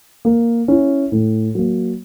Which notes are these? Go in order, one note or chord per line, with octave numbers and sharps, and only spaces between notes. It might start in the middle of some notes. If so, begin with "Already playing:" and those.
A#3
C#4 E4
A2
F#3 A#3